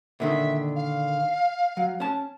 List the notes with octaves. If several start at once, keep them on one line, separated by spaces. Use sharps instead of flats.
A#2 D3 D#3 E5
F5
F#3
C#4 A5